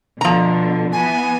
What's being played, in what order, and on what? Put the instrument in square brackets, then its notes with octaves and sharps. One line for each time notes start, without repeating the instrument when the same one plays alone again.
[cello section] B2 D3 [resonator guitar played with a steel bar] F3 A#5
[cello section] E3 B3 [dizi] G#5